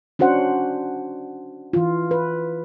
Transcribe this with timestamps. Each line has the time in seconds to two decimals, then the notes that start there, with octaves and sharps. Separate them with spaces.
0.19 C#4 D4 F#4 C5 F#5
1.73 E3 F4
2.11 B4